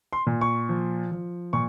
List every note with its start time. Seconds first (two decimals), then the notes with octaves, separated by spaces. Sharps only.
0.13 C6
0.27 A#2
0.41 C#6
0.69 F3
1.12 F3
1.53 A#2 C#6